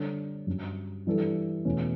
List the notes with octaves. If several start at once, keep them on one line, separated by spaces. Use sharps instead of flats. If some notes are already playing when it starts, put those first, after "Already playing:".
Already playing: D3 G3 D4 A4 C#5
G2 F#3 C#4
E3 G3 D4 A4
E2 B2 A3 C#4